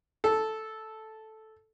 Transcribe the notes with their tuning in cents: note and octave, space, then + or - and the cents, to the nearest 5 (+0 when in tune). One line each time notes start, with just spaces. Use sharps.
A4 -5